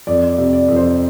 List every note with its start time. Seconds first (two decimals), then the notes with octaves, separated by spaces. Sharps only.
0.07 F2 D5
0.30 D5
0.38 C3
0.53 D5
0.68 F2
0.76 C5